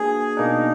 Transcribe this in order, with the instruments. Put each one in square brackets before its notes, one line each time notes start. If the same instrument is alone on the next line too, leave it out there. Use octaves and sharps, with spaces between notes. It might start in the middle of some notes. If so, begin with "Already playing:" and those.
Already playing: [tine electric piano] A#3 D4 F#4 B4 [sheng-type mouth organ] G#4
[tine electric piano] B2 A#3 D4 [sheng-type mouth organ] D#4